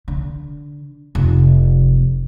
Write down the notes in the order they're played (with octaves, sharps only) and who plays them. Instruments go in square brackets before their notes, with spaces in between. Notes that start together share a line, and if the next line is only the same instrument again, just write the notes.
[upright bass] D3
F1